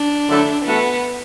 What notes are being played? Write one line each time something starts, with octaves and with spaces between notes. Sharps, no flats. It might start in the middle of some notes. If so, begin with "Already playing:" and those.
Already playing: D4
D3 F#3 A3 E4 A4
E3 A3 B3 F#4 A4